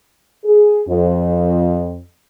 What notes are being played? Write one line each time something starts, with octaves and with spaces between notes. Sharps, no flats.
G#4
F2